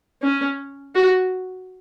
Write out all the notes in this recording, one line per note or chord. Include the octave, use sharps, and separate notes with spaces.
C#4
F#4